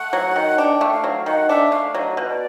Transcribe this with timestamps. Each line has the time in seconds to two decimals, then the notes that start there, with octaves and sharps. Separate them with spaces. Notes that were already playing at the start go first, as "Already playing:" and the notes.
Already playing: A3 F#5
0.13 F#3
0.36 D#3
0.58 D4 G5
0.81 A3
0.92 F5
1.04 F#3
1.26 D#3 F#5
1.49 D4 E5
1.72 A3 F5
1.94 F#3 D#5
2.17 B2
2.28 D5